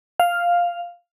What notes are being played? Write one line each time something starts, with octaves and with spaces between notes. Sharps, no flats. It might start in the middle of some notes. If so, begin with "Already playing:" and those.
F5